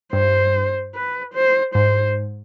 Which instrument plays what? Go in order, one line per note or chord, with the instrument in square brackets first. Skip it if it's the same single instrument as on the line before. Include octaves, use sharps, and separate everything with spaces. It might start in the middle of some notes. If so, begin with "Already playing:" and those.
[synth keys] G2 [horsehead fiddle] C5
[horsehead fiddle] B4
C5
[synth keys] G#2 [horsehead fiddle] C5